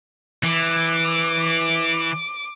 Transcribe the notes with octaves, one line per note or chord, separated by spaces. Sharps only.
E3 D6